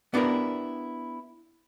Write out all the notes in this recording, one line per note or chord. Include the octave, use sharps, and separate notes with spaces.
B3 D4 E4 G4 A#4